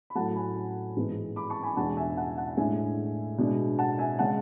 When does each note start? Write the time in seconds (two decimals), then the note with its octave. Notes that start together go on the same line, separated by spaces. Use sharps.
0.10 B5
0.15 A2 F#3 A3 F#5 A5
0.36 G#5 B5
0.96 G#2 E3 B3 E4
1.36 B5 D6
1.50 A5 C#6
1.63 G#5 B5
1.77 E2 B2 G#3 D4 F#5 A5
1.97 E5 G#5
2.17 F#5 A5
2.37 F#5 A5
2.57 A2 G#3 D4 E5 G#5
3.38 B2 G#3 D4
3.79 F#5 A5
3.99 E5 G#5
4.19 C#3 G#3 C#4 F#5 A5